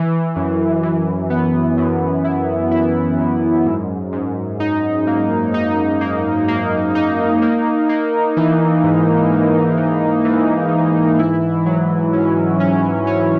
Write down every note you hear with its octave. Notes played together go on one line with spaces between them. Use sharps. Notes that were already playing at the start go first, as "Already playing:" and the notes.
Already playing: E3
F#2
E3
B3
F#2
E4
E4
F#2
G#2
G#2
D#4
A#3
D#4
A#3
A#3
D#4
A#3
A#3
E3
G#2
G#2
E3
E3
G#2
E4
F#3
C#4
C#4
C#4